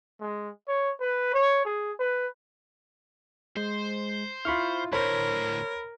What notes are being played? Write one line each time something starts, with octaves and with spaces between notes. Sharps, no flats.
G#3
C#5
B4
C#5
G#4
B4
G#3 C5
E4 F4 B5 C#6 F6
D2 A2 A#4 C5 C#5 B5